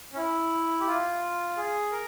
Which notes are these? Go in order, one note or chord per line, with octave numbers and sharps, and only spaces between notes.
C#4
E4
G4
F4
G#4
A#4